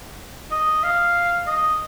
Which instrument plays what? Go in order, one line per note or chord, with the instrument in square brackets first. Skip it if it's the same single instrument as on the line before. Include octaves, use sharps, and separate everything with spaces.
[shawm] D#5
F5
D#5